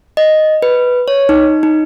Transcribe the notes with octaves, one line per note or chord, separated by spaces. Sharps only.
D#5
B4
C#5
D#4
D#4